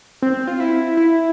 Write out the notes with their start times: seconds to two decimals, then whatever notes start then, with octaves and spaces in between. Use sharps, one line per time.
0.22 C4
0.47 F4
0.60 E4
0.97 E4